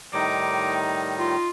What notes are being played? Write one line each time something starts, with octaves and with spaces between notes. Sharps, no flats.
A2 D#3 G3 D#4 D6
F4